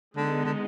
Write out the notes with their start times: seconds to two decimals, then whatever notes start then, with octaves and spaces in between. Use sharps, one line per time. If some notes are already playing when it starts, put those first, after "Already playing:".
0.16 D3 G#3 B3 D#4
0.45 D3